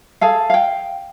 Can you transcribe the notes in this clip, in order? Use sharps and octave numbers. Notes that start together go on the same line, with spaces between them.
G#4 A4 F5
F5 G5